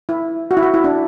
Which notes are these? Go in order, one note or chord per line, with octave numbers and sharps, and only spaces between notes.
E4
F#4
E4
F#4
E4
D4